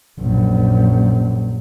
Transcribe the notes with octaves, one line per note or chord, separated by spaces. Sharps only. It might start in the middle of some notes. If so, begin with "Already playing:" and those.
A#1 F#2